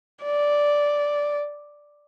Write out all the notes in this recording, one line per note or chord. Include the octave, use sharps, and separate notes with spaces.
D5